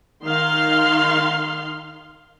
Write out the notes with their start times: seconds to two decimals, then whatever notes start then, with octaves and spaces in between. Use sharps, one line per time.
0.23 D#3 F5 C6